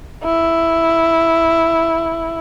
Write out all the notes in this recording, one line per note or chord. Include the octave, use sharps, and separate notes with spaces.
E4